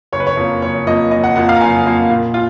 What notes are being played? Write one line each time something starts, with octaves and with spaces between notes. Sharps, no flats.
F#1 C#5
B4
C#5
F2 F3 A#3
F#1 C#5
F2 F3 A#3 D#5
F#1 D#5
F#5
F2 F3 A#3 F#5
F5
A#5
F#1 G#5
F2 F3 A#3
A#2
F4